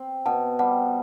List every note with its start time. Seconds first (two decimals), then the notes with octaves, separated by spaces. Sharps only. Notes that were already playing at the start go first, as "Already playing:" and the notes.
Already playing: C4
0.26 B2 F#5 A5
0.59 G3 F#5 A5